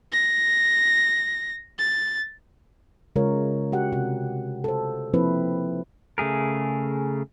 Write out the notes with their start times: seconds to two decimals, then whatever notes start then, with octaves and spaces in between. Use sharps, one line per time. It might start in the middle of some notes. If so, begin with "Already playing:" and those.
0.12 A#6
1.79 A6
3.16 C#3 G#3 F4 A#4 C#5
3.72 F#4 G4 F#5
3.92 C3 F#5
4.64 A4 C5
5.14 F3 A#3 C4 E4 B4
6.18 C#3 A3 G#4 A#4